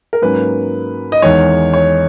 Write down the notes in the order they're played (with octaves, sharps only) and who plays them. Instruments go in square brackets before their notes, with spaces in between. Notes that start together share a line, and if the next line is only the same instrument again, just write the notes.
[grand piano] A#4
G#2 F#3 A#3 C#4 B4
D#5
E2 D#3 G#3 C#5
C#5